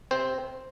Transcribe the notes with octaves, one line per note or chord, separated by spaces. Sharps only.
C3 C4 C5